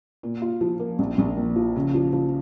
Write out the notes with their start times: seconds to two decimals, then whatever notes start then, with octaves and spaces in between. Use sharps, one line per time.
0.23 A#2
0.42 F4
0.61 F3
0.79 A#3
0.99 A#1
1.18 A#1
1.37 A#2
1.56 F3
1.76 C#3
1.94 F3
2.13 F3